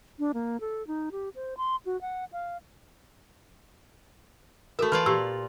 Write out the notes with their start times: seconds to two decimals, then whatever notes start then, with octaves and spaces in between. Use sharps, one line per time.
0.19 D4
0.34 A#3
0.61 A4
0.87 D#4
1.12 G4
1.35 C5
1.57 C6
1.86 F#4
2.01 F#5
2.33 F5
4.79 A3 F#4 A4 A#4 E5
4.92 E3 F4 B4 D5
5.06 A#2 G4 E6